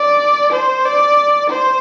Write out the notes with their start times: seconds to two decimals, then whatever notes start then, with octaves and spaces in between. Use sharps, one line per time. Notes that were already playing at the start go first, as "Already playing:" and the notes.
Already playing: D5
0.53 C5
0.85 D5
1.50 C5